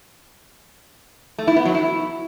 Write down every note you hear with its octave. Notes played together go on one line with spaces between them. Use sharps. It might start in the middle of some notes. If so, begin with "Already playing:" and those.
A3
E4
B3
F#3
E4